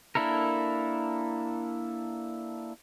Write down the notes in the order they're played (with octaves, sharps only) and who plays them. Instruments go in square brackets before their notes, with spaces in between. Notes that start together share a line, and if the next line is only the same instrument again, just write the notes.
[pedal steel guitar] A#3 D4 E4 A4 A#4